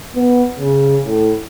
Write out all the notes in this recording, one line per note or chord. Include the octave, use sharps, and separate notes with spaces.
B3
C#3
A2